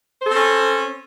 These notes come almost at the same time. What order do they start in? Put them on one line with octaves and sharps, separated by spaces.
C5 A4 C4 C#4